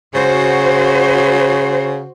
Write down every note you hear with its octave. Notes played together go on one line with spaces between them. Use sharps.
C#3 F#4 C5